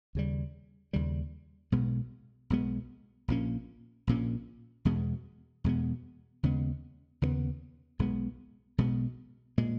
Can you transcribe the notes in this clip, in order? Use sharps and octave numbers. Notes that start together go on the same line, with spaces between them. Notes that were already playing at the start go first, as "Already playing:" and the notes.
D#2 C#3 G3
D#2 C#3 G3
B1 B2 G#3 B3
B1 B2 G#3 B3
A#1 A#2 A#3 C#4
A#1 A#2 A#3 C#4
E2 B2 G#3 B3
E2 B2 G#3 B3
D#2 C#3 G#3 B3
D#2 C#3 G#3 B3
B1 B2 G#3 B3
B1 B2 G#3 B3
A#2 G#3